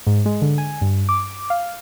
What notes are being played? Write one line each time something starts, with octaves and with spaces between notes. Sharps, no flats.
G#2
G#3
D3
G#5
G2
D6
F5